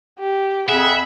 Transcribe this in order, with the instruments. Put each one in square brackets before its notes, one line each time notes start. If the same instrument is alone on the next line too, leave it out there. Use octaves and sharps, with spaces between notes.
[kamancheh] G4
[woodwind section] F2 G#4 F#5 [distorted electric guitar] E5 [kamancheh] B5